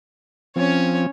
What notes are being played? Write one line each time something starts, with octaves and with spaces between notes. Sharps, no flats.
F3 C4 C#4 C#5